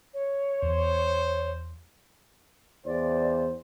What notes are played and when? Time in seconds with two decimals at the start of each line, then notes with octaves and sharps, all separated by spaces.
0.13 C#5
0.62 E2 C5
2.86 E2 C5 D5